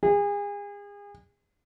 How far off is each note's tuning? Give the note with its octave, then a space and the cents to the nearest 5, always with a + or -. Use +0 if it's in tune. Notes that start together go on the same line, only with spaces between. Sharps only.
G#4 -35